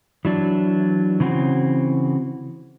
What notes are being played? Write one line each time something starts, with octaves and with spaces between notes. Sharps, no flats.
E3 F#3 D4
C#3 E3 C4 F#4